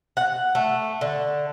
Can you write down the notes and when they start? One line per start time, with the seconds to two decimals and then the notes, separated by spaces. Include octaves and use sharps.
0.17 F#5
0.55 A3
1.01 D3